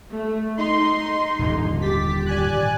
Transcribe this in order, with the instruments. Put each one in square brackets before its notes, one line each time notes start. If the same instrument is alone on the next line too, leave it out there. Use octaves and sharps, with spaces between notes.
[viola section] A3
[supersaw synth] D#4 [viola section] C6
[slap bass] D#1 G#2 D3
[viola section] G4 [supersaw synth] A6 B6
[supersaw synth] D5 G#5 F#6